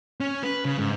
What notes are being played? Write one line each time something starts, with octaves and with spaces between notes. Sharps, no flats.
C#4
B4
C#3
G#2